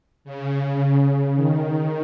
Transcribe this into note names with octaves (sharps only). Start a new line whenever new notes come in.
C#3
D#3